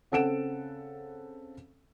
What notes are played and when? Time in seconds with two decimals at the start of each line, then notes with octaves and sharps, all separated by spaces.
0.12 C#3 C4 A4 F#5 D7 E7